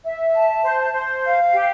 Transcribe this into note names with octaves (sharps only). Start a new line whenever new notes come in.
E5
A5
C5
C5
F5
G4